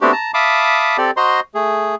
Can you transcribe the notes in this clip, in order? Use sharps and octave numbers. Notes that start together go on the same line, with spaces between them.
A3 B3 C4 D4 F#4 G4
A5 A#5
E5 F5 A5 B5 D6 D#6
C4 G4 A4 D5
F#4 C5 D#5 A#5 C6
A3 G#4